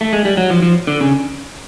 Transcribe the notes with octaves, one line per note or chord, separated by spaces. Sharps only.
A3
G#3
G3
F#3
F3
F3
D3
C#3